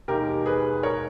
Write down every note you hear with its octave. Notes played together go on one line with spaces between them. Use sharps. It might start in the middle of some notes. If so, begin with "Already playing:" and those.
E1 D#2 D#3 G4 A#4
G#4 B4
A#4 C#5